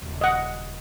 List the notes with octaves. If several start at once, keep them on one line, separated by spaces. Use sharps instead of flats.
D#1 C#2
D#5 F#5